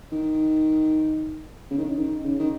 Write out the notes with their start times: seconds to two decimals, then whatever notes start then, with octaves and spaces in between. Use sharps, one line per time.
0.12 D#3
1.70 C#3
1.78 D#3
1.85 C#3
1.97 D#3
2.23 C#3
2.39 D#3